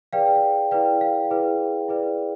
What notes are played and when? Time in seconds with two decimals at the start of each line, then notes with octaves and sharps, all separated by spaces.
0.13 E4 G#4 B4 D5 F5 G5
0.71 E4 G#4 B4 D5 F5 G5
1.01 F5
1.30 E4 G#4 B4 D5
1.88 E4 G#4 B4 D5